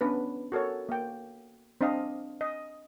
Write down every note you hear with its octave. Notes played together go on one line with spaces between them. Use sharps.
B3 C#4 D4 B4
F#4 A4 A#4 C#5
A#3 G5
C4 D4 D5 D#5 F5
D#5